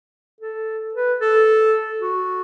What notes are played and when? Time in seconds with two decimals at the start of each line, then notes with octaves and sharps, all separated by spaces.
0.41 A4
0.94 B4
1.20 A4
2.02 F#4